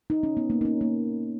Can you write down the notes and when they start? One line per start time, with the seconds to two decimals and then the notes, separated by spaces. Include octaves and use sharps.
0.10 D#4
0.23 C#4
0.37 B3
0.50 A#3
0.61 D#4
0.65 C#4
0.81 A#3